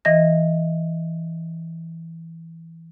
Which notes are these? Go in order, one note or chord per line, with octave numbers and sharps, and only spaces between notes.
E3 D#5 A#6